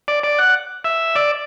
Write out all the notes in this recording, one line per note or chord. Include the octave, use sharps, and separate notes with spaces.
D5
D5
F#5
E5
D5